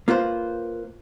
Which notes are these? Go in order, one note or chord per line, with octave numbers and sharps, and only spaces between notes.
A#3 F4 B4 C5